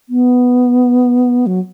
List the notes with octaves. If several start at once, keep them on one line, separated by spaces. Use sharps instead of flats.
B3
F#3